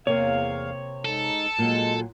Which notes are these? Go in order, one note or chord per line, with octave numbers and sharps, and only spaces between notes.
E2 C3 A#3 C4 C#5 F5
G#3 D#4 A4
A#2 F#3 G#3